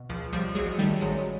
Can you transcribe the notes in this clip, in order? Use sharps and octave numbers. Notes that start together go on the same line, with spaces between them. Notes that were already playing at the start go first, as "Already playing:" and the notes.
Already playing: B2
C#2 F3
C#2 F3 G3
A1 F#3 G#3
D#3 G3 A3
A1 F#3 G#3